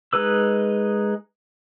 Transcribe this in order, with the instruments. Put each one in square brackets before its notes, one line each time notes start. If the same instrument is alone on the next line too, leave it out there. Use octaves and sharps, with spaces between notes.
[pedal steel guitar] G#3 D#4 B4 E6